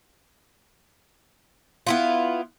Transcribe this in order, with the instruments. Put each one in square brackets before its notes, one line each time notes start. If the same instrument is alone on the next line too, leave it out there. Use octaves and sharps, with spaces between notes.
[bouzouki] B3 E4 F4